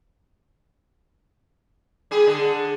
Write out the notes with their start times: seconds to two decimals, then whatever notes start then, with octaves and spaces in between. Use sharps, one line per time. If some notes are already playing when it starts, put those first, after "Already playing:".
2.11 G3 G#4
2.27 D3